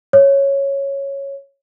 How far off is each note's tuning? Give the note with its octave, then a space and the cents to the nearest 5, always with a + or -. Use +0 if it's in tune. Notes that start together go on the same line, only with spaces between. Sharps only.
C#5 -5